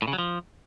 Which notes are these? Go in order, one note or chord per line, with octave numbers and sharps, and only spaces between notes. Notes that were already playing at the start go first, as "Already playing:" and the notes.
A2
C#3
F#3
F3